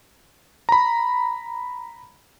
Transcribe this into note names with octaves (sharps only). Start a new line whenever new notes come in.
A#5 B5